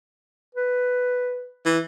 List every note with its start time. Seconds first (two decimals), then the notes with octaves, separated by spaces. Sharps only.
0.55 B4
1.66 E3